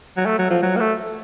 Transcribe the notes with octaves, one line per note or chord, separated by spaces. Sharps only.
F#3
A3
F#3
F3
F#3
A#3
A3